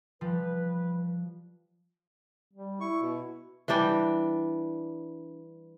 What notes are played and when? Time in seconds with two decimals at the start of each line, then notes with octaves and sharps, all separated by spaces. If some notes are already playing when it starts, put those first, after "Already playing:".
0.21 F3 G3 B4
2.54 G3
2.81 E4 C#6
3.01 B2
3.68 E3 G3 D4 G5